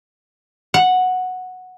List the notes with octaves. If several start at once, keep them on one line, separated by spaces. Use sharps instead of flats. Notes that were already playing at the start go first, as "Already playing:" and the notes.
F#5